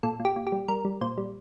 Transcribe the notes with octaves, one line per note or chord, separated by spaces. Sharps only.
A#2 A4
A#2
G4
A#2
G4
G3
G3 A#4
G3
A#2 C5
G3